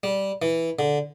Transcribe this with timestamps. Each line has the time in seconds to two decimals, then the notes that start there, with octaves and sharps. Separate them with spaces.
0.03 G3
0.42 E3
0.79 D3